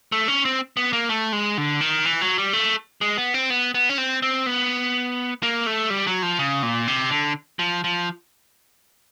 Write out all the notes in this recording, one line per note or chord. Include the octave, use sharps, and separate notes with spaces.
A3
C#4
C4
B3
A#3
A3
G#3
D3
D#3
E3
F#3
G3
A3
G#3
B3
C4
B3
B3
C#4
C4
C4
B3
A#3
A3
G3
F#3
F3
C#3
A#2
C3
D3
F3
F3